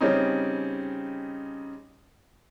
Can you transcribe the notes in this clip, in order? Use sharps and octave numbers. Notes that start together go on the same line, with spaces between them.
C#3 G3 C4 C#4 D#4